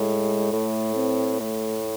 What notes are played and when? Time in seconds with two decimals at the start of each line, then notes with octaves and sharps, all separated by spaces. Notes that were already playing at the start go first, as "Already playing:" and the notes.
Already playing: A2 G#3
0.53 A2 A3
0.96 C4
1.40 A2 A3